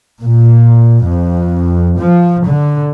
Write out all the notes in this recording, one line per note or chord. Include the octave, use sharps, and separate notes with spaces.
A#2
F2
F3
D3